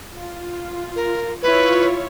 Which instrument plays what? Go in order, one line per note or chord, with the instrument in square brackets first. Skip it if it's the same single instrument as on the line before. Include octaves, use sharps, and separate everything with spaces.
[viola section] F4
[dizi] A#4
[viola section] E4 F4 C#5 [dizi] B4